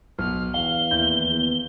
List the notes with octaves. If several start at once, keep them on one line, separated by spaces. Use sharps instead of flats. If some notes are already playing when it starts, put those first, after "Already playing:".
B1 F6
E2 F5 G7
D#2 E4 G6
B3